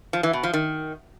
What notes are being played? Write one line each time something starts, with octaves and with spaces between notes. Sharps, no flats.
F3
E3
B2
F3
D#3